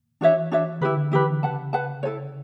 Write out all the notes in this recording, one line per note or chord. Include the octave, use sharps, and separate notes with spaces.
E3 D4 F#4 C#5 E5
D4 F#4 C#5 E5
D3 E4 G4 B4
D3
E3 E4 G4 B4
D3
C#3 B4 F#5 A5
B4 F#5 A5
E4 A4 C#5